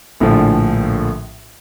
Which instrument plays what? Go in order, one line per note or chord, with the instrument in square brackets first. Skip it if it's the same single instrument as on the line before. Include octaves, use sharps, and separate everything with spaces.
[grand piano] A#1 A2 D3 F3